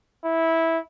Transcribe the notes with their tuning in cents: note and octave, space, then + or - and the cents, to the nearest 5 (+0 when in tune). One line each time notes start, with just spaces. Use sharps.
E4 -10